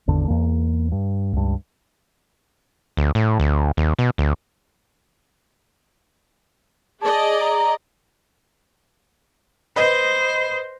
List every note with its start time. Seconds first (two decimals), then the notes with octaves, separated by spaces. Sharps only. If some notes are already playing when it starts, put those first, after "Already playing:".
0.07 G#1 E2 D3 D4
0.28 E2 A#3
0.92 G2
1.33 C#2 G2
2.97 D2
3.15 A2
3.39 D2
3.77 D#2
3.99 B2
4.18 D2
7.01 G#4 D5 D#5 A5
7.41 A#5
9.76 B4 C5 D#5